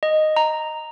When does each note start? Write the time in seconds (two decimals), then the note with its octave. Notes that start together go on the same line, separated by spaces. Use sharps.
0.03 D#5
0.36 A#5